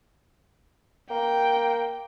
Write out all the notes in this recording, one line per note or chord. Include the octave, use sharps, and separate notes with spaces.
A#3 G5